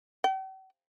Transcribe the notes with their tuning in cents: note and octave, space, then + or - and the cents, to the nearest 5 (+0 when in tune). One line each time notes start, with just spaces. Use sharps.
G5 -45